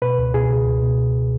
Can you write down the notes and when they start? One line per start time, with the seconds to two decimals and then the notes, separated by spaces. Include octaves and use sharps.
0.02 B2 B4
0.18 C#2
0.34 B2 G#4
0.50 C#2
0.67 C#2
0.83 B2